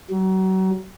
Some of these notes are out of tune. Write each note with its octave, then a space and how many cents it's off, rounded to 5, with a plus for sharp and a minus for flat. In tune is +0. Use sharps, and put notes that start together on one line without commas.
F#3 +35